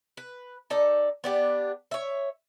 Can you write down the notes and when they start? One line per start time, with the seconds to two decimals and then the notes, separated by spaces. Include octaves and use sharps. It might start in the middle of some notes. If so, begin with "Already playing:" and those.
0.17 B4
0.70 D#4 A4 D5
1.24 B3 D4 G4
1.91 C#5 E5